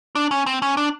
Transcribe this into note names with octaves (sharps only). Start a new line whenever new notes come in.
D4
C#4
C4
C#4
D4